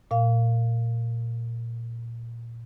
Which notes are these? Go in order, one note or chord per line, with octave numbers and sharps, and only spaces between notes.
A#2 F5